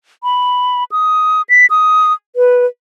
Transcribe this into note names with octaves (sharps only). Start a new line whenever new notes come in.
B5
D#6
B6
D#6
B4